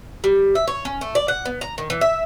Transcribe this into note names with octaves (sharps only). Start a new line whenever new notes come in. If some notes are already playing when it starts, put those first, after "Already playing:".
G3
E5
C#5
C#4
A3
D5
F#5
B3
A#5
D#3
E3
E5